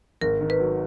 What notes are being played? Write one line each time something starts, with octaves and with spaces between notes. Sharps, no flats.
G#1 A#4
D#3
B4
F#3